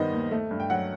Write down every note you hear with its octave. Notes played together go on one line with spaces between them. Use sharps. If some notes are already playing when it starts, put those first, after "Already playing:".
Already playing: G2 D#3 G3 B3 C5 D#5
D#2
A3
G2
G5
F#3 F#5